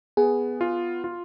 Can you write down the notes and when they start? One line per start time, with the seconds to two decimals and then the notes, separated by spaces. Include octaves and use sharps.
0.17 B3 G#4
0.61 F4
1.04 F4